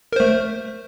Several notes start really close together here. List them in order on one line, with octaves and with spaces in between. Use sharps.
A#4 C5 A3